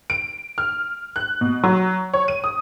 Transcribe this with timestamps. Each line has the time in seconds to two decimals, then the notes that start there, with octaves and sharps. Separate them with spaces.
0.10 D7
0.58 F6
1.16 F#6
1.41 B2
1.64 F#3
2.13 C#5
2.28 D#7
2.44 D#6